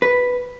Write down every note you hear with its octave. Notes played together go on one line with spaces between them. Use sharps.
B4